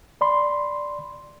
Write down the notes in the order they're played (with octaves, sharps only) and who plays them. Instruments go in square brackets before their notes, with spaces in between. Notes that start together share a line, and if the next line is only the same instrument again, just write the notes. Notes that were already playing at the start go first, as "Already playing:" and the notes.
[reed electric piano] D5 B5 C6